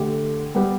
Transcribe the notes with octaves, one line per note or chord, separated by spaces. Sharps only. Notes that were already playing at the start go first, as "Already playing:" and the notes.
Already playing: D3 A3 G4
G3 B3 G4 B4